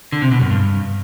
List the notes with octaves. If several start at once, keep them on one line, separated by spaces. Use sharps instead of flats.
D3
C3
B2
F#2
G2